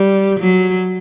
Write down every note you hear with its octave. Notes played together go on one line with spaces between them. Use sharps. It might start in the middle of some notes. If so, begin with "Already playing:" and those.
Already playing: G3
F#3